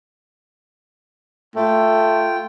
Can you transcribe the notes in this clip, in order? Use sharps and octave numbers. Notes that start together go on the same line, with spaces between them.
A3 F4 G5